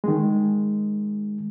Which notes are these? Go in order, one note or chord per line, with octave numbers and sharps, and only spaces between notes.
D#3 G#3